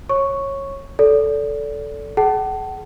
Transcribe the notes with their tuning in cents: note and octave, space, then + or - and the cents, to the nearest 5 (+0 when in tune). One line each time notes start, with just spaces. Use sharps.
C#5 -20 C#6 +0
A4 +0 D5 -30
G#4 +35 F#5 +40 A5 +0